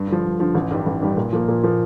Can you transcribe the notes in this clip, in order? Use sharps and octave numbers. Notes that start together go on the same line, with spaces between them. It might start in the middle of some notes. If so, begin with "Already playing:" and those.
Already playing: G2
D3 F3
G2
D3 F3
A1
G2 D#3 G3 D4
A1
G2 D#3 G3 D4
A#2
F3 A#3
A#2
F3 A#3